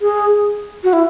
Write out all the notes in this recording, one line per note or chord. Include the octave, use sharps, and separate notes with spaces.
G#4
F#4
E4